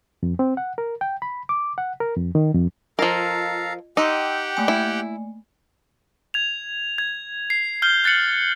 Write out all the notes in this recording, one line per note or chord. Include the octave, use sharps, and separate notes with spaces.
F2
C4
F#5
A#4
G5
B5
D6
F#5
A#4
F2
D#3
F2
F3 F4 A4 A#4 D#5 F5 A#5
D#4 G4 F#5 G5 C6 D6 E6
A3 A#3 G#5
E4
G#6 F7
G#6
C7
F6 G6 G7
F#6 A6 C7 C#7 F#7